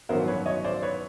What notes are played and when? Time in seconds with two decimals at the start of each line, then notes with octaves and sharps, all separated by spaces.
0.09 A1 G2 D#3 F#3 B3 A#4 C5
0.27 B4 C#5
0.46 C#5 D#5
0.64 C5 D5
0.82 B4 C#5